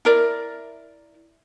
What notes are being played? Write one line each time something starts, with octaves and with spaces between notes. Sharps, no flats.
E4 A#4 D5